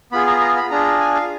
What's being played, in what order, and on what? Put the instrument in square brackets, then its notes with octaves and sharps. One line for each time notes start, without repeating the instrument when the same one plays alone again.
[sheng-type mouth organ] B3 F4 G#4 B5
A#5
A#5
B5
D4 F4 G#4 A#5
G#5
F5